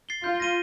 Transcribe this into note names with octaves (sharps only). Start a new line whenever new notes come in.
A6 C7 G7
F4 G6
A#6 D#7 G7